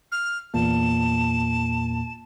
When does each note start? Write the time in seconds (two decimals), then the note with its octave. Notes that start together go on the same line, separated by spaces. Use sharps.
0.12 F6
0.54 E2 A#2 A#3 A5